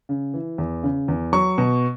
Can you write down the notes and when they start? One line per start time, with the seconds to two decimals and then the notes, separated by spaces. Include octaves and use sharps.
0.09 C#3
0.34 E3
0.58 E2
0.83 C#3
1.08 E2
1.33 F#3 C#6
1.58 B2